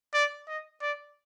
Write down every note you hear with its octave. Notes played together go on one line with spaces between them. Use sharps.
D5
D#5
D5